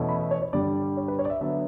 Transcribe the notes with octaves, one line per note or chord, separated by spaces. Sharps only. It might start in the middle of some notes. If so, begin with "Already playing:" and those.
Already playing: E2 B2 A3 C#4 E4
B5
E5
C#5
C#5
G2 D3 G3 D5
C#5
B4
C#5
D5
E5
D3 F#3 B3 E5